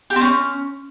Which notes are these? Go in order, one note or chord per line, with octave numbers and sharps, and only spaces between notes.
G4
C4
C#4